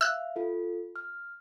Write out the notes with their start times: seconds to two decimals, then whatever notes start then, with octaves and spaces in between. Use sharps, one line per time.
0.01 E5 F5 E6 F#6
0.36 F4 A4
0.96 F6